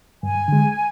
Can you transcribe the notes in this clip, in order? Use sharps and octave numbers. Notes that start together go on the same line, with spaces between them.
G2 G#5
D3 G#3